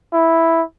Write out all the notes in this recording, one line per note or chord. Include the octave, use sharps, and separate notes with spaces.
E4